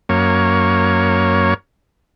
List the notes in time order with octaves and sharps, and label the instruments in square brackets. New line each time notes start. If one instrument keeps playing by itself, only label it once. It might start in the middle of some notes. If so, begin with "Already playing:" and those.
[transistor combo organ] F#2 A#3 C#5